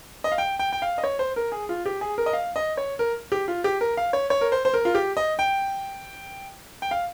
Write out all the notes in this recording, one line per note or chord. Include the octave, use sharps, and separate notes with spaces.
D#5
F5
G5
G5
G5
F5
D#5
C#5
C5
A#4
G#4
F4
G4
G#4
A#4
D#5
F5
D#5
C#5
A#4
G4
F4
G4
A#4
F5
C#5
C#5
A#4
C5
C5
A#4
F4
G4
D#5
G5
G5
F5